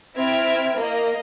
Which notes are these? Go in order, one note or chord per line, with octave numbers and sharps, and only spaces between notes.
C4 E4 E5 F6 G#6 D7
A#3 D#5